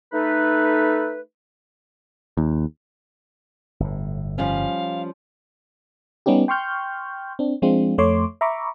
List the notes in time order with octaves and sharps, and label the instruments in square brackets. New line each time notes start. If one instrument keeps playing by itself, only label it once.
[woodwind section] A3 D#4 A4 B4
[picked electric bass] D#2
[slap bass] G1 A2
[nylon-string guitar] F3 G3 C#4 [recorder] F5
[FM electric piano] G3 B3 C#4 D#4 G4
G5 C6 C#6 F6 G6
C4 D4
F3 G#3 C4 D4 F4
F2 A3 C#5 C6 D6
E5 A#5 B5 C#6 D6